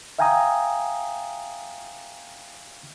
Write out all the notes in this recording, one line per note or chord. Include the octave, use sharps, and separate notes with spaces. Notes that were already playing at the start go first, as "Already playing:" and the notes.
E5 F5 G5 G#5 A#5 D#6